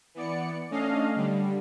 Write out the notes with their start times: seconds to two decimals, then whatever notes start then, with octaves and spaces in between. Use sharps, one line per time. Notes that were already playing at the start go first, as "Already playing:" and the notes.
0.15 E3 B3 D5 C#7
0.70 A3 C#4 D4 D#5 F5
1.15 D3 G3